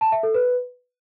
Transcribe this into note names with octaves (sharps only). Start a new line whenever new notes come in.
A5
E5
A4
B4